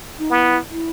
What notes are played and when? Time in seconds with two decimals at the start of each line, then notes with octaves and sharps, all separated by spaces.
0.19 D#4
0.30 B3 E4
0.71 E4